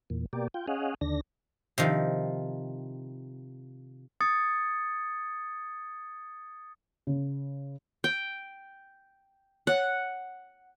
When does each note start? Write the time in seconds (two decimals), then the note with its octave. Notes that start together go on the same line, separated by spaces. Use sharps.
0.10 E2 A#2
0.33 B2 A#3 G4 D5
0.54 F4 G5
0.68 C#4 G#4 D#5 F5 F#5
1.01 D#2 D3 D4 A#6
1.78 C3 D#3 F3
4.21 D#6 G#6 A6 C#7
7.07 C#3
8.04 G5
9.67 C#5 F#5